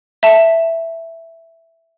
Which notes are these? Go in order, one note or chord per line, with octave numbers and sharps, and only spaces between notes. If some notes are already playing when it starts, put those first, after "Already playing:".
E5 A5